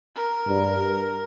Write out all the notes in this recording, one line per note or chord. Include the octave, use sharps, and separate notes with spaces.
A#4
G2